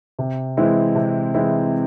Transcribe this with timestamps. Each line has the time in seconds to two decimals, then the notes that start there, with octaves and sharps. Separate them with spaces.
0.19 C3
0.57 E3 G#3 C4 E4
0.95 C3
1.34 E3 G#3 C4 E4